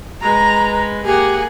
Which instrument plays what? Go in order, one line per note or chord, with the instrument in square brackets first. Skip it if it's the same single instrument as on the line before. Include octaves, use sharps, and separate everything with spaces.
[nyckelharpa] G#3 B4 [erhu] A#5
[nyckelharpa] A#3 F#5 [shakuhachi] G4 [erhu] G#4